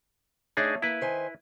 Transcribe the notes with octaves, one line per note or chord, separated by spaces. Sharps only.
A3 D4 D#4 G#4 C#5
A#3 E4 B4
D#3 C5 G#5